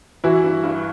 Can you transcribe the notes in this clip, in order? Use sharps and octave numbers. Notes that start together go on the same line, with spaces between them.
E3 E4 F#4
G2
G2